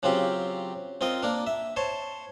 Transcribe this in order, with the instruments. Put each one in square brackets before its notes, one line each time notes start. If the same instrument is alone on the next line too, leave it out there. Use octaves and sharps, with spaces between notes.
[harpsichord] C#3 F#3 C4 F4 G4
C4 F4 A#4 D#5
A#3 D4 A#4
E5
C5 C#5 A5